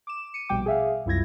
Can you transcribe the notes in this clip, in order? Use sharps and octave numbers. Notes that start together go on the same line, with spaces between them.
D6 E7
C#7 D#7
A#1 B2 G3 G5 D6
G#4 E5 F5
C2 F#2 E4 F4 G#6 A#6